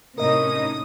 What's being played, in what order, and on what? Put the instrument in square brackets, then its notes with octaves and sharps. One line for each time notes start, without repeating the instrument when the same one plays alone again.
[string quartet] A2 D#6 [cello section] C3 C#4 D#4 [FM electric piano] A#4 D#5